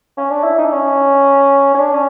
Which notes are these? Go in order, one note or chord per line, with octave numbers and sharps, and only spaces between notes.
C#4
D4
E4
D#4
D4
C#4
C#4
D4
C#4